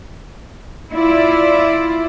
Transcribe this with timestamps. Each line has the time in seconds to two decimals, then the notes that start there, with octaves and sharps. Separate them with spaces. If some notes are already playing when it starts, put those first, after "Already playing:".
0.91 E4 F4 D5